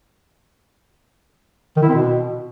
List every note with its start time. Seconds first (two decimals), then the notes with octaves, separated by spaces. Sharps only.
1.76 D#3
1.83 E4
1.89 C4
1.95 B2